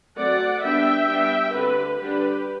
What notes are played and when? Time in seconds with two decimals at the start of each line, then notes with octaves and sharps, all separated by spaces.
0.17 F#3 A3 C4 D5 F#5
0.63 G3 B3 D4 E5 G5
1.07 G3 B3 D4
1.54 D3 A3 C4 G4 B4
1.99 D3 G3 D4 G4 B4